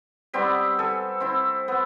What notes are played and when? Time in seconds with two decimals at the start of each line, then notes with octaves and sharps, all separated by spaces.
0.34 G3 B3 C4 G4
0.79 A4 G#5
1.20 C4 E4
1.68 B3